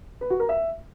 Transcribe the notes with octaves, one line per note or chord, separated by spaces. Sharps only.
B4
F#4
A#4
E5